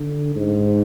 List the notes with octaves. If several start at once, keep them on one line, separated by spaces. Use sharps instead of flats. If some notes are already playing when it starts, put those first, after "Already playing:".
Already playing: D3
G#2